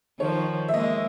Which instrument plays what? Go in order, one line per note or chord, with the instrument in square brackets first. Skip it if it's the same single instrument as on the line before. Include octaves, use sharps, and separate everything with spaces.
[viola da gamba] D#3 F3 [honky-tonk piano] C#5
[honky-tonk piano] E5
[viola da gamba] G#3 A#3 [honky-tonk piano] D#5